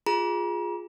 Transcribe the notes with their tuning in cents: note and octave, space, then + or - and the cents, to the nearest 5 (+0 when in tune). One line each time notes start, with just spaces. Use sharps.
F4 +10 G#4 +0 A#5 +40